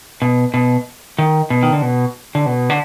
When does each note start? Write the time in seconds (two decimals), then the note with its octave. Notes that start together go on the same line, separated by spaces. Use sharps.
0.22 B2
0.54 B2
1.19 D#3
1.50 B2
1.63 D#3
1.73 D3
1.82 B2
2.35 D3
2.46 B2
2.70 D3